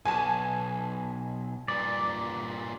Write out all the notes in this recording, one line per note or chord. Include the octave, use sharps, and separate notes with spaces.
B1 G#5 A5
G2 A#2 D5